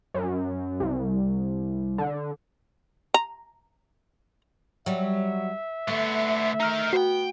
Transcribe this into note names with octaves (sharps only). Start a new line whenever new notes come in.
F#2
C2
D3
A#5
F#3 G3 E5
D3 A3 B3
D#4 A#4 A#5 F6
B3 F#4 C5 G5